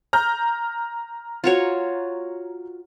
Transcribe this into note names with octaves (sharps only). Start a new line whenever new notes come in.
A#5 F6 G6
F4 F#4 C#5